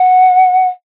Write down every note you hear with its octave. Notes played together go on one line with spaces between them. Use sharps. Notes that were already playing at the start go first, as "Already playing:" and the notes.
Already playing: F#5